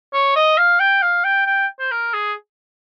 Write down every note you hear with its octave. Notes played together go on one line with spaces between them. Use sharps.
C#5
D#5
F5
G5
F5
G5
G5
C5
A#4
G#4